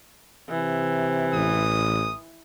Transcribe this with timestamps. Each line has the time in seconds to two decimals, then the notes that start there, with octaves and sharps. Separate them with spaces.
0.50 C3 E3
1.34 A1 D#6